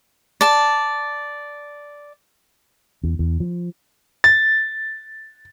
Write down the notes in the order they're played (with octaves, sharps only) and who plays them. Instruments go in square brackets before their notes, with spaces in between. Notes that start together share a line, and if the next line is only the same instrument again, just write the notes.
[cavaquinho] D5 A5
[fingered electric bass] E2
E2
F3
[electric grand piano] A6